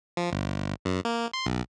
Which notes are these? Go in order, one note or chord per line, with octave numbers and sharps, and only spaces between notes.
F3
G1
F#2
A#3
C6
B1